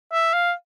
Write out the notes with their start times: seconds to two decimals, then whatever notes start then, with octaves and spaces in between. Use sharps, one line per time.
0.13 E5
0.34 F5